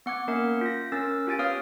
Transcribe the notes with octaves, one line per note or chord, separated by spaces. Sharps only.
B3 F#5 D6 G#6
A#3 C#4 A#4 E5 F#5
F4 A#6
C#4 A#4 E6 A6
F4 G4 G#5 A6 D7
B3 B4 C#5 F5 D#6 F6